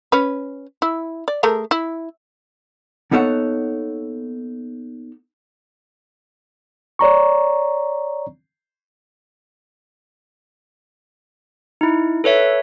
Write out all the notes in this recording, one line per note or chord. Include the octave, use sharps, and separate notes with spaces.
C#4 B4
E4
D5
A3 G#4 A#4
E4
A#3 B3 D#4 A4 C#5 F#5
C#5 D5 A#5 C#6
D#4 E4
A4 B4 C#5 E5